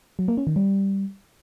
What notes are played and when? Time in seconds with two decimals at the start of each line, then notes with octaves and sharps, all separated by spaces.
0.19 F#3
0.28 A#3
0.37 C#4
0.47 D#3
0.56 G3